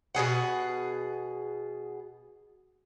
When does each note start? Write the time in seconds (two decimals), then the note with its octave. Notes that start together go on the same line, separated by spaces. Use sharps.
0.15 B2 F#3 G#4 F#5